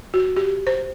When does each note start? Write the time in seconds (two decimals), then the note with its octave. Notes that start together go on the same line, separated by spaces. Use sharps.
0.14 F#4
0.36 G4
0.67 C5